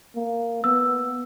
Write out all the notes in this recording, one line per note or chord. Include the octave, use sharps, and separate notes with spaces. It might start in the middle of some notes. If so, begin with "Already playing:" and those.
A#3
B3 E6